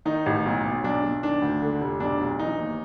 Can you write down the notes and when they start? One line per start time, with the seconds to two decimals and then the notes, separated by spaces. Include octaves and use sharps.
0.05 D#3 D#4
0.26 A1
0.46 B1
0.65 B1
0.84 B1 D4
1.03 B1
1.23 D#3 D4
1.42 D2
1.62 D3
1.81 F1
2.00 B1 D4
2.19 B1
2.39 E3 D#4
2.59 D#2